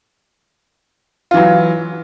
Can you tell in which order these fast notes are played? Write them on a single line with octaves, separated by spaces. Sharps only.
F4 E3 F#3